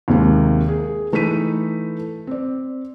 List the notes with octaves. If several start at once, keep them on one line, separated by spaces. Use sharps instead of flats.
D#2 C3 D#3 G#3 A#3
G#4 A#4
E3 A3 D#4 B4 B6 D#7
C4 D5